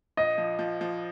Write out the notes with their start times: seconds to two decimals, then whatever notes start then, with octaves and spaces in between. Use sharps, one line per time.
0.17 A#1 D#5
0.38 F3
0.59 F3
0.81 F3